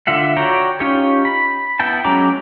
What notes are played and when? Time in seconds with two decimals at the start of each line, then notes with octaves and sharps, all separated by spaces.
0.07 D3 F4 E5 F#5
0.37 F#4 C#5 D5 G5 A#5
0.80 C#4 D#4 F4 G4 C#5
1.25 B5
1.79 B3 E4 G5 A5
2.04 F#3 G#3 C#4 A#5 D6